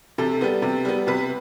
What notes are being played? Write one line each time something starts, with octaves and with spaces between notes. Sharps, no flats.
C3 A4
G3 B3
C3
G3 B3
C3 B4